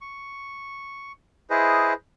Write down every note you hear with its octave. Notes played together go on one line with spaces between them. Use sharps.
C#6
E4 G#4 B4 C5 D#5